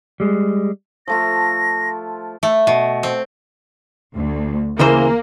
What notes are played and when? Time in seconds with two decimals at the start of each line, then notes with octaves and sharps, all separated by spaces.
0.20 G3 G#3
1.08 F3 A3 F4 A#6
2.43 A3
2.67 B2
3.03 C4
4.16 D2
4.79 C#3 E3 A#3 C5